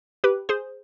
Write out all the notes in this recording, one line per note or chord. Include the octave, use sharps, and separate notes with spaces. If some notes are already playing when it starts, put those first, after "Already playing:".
G4 B4
G#4 C5